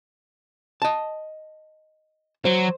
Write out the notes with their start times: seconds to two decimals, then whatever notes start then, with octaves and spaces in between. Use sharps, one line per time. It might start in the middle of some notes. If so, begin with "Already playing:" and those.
0.82 D#5 A5
2.45 F#3 C5